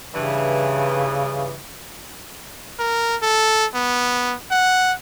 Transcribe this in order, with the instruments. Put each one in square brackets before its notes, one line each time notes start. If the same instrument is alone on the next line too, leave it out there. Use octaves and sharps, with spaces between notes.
[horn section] G2 E3 [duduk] C#3
[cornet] A#4
A4
B3
F#5